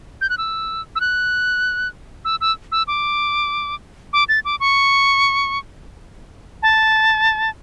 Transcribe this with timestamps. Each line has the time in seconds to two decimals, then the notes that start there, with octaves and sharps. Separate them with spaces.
0.21 G6
0.30 F#6
0.38 E6
0.96 E6
1.01 F#6
2.25 E6
2.41 E6
2.72 E6
2.87 D6
4.13 D6
4.29 A6
4.45 D6
4.60 C#6
6.62 A5